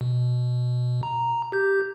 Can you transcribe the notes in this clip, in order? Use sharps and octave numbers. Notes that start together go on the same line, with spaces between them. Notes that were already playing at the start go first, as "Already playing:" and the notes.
B2
A#5
G4 G6